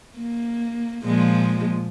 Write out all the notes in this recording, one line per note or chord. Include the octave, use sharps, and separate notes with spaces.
A#3
A#2 F3 G#3